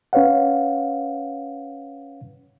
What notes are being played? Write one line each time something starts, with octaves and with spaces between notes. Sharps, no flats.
C#4 B4 C#5 F5 F#5